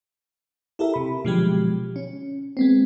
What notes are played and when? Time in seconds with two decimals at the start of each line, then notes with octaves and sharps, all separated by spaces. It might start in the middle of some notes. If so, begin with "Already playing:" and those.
0.79 E4 G4 A4 A#4 E5
0.94 C3 B5
1.25 B2 D3 F3 F#3 G#3 G4
1.96 C#4
2.57 G#3 B3 C4